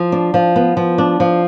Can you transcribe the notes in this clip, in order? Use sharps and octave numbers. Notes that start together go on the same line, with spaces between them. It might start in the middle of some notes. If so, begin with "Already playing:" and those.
Already playing: F3
D4
F3
B3
F3
D4
F3